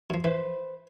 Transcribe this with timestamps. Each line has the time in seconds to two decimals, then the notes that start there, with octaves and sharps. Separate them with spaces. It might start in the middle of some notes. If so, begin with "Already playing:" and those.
0.10 F#2 F3
0.24 E3 B4 C5